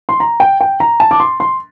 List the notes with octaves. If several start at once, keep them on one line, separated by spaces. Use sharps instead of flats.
C6
A#5
G5
G5
A#5
A5
D6
C6
C6